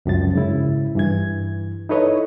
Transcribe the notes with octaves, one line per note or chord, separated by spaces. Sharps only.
C#2 F#2 F3 A6
G#2 C#3 E4
G2 E3 G#6
D#4 E4 A4 B4 C#5 D#5